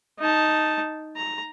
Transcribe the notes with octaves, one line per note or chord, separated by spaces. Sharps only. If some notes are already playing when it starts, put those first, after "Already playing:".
D#4 A5
A#5